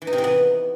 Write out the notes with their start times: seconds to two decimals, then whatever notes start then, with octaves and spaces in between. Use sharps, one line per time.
0.02 E3
0.07 D#4
0.13 C3
0.18 E3
0.24 B3